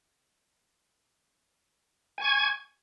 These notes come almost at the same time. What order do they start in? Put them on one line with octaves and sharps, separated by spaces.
G#5 C#6 G#6